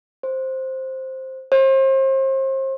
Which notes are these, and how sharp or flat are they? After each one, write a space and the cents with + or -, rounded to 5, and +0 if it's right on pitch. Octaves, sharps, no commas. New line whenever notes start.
C5 +5
C5 +35